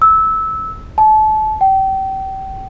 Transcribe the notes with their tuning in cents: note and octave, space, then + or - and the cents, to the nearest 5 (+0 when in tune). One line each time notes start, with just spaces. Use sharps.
E6 -15
A5 -30
G5 -30